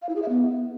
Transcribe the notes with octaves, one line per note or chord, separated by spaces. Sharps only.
F5
E4
G#4
E5
B3